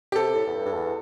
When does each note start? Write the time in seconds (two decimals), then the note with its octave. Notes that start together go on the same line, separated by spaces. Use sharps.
0.12 G4
0.16 C3 A4
0.35 A2
0.47 E2
0.55 G2
0.65 G2
0.73 E2